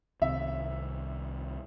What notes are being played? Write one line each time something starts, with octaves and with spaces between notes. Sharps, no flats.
C2 C3 D#3 E5